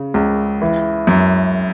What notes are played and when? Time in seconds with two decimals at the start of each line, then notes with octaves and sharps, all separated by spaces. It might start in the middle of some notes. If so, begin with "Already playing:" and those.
Already playing: C#3
0.14 C#2
0.62 E3
1.07 F#2